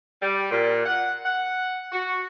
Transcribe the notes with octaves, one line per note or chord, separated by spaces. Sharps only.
G3
A#2
F#5
F#5
F#4